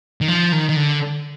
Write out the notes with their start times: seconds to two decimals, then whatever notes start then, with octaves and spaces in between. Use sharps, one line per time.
0.21 D#3
0.28 F3
0.52 D#3
0.69 D#3
0.76 D3